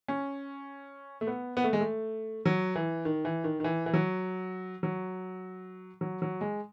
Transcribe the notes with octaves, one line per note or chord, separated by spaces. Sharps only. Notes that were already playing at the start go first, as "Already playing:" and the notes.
C#4
A3
B3
B3
A3
G#3
A3
F#3
E3
D#3
E3
D#3
D#3
E3
E3
F#3
F#3
F#3
F#3
G#3